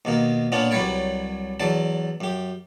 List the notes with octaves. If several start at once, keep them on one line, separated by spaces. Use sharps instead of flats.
D#2 B2 A#3
A#2 B3 C#4 D4 F4
C2 F#3 G3 B4 C#5 D5
E2 F#3 D5 A5
F#2 G4